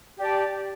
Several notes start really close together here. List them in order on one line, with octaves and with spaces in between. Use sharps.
G4 D5 A5